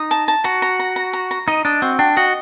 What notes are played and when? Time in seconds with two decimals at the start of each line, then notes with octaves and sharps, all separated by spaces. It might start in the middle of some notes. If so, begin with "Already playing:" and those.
Already playing: D#4 D#6
0.11 A5
0.28 A5
0.44 F#4 A#5
0.62 A#5
0.79 A#5
0.96 A#5
1.13 A#5
1.31 A#5
1.48 D#4 D#5
1.65 D4 D#5
1.82 C4 F#4
1.99 D4 G5
2.16 F#4 D#5